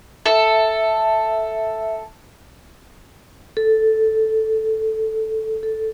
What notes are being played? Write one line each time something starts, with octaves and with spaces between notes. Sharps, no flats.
A4 E5
A4
A4